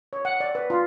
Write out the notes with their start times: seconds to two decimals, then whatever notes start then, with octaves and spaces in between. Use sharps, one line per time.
0.13 C#5
0.25 F#5
0.40 D5
0.55 B4
0.70 F4